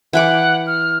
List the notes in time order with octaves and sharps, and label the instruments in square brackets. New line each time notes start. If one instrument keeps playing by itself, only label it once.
[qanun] E3 G5 D6 [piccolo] F#5
[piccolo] F6